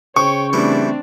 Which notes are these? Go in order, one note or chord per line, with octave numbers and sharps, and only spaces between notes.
C#3 C5 C#5 G5 C#6
E3 G3 A3 C4 D4